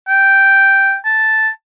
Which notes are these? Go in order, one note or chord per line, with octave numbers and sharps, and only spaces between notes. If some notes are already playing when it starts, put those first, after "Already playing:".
G5
A5